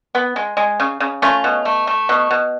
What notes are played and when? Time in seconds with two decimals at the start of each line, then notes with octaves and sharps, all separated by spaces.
0.15 B3
0.36 G#3
0.57 G#3
0.80 C#3
1.00 C#3
1.22 A3 C#4 F4
1.44 B2
1.65 A3
1.87 A3
2.09 B2
2.31 B2